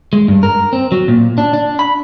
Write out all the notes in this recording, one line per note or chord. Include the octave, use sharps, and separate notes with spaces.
G#3
G2
A#4
C4
F#3
A#2
D4
D4
B5